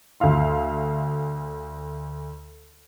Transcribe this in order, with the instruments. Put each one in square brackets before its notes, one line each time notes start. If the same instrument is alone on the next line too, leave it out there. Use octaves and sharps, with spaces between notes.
[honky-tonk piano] D2 E5 F5 C6